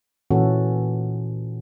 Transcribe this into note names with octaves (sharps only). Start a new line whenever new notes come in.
A#2 E3 C#4 F#4 A4